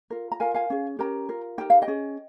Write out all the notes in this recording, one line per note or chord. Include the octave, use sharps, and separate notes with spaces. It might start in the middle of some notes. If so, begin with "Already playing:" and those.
F4 A#4
A#5
F4 A#4 F5 G#5
F5 G#5
C#4 G#4
C#4 G4 A#4 G5 A#5
F4 A#4
D#4 G4 A#4 G5
F5
D#5 G5
C#4 G#4